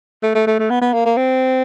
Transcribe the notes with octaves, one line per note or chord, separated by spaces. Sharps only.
A3
A3
A3
A3
B3
B3
A#3
A#3
C4